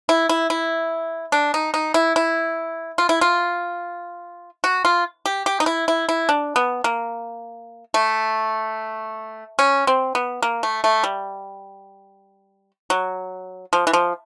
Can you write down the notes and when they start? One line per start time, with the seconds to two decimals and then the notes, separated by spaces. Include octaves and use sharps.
0.09 E4
0.29 E4
0.50 E4
1.32 D4
1.54 D#4
1.74 D#4
1.94 E4
2.16 E4
2.98 F4
3.09 E4
3.21 F4
4.64 F#4
4.85 F4
5.26 G4
5.46 G4
5.60 D#4
5.66 E4
5.88 E4
6.09 E4
6.29 D4
6.56 B3
6.84 A#3
7.94 A3
9.59 C#4
9.87 C4
10.15 B3
10.42 A#3
10.63 A3
10.84 A3
11.04 G3
12.90 F#3
13.73 F3
13.87 E3
13.93 F3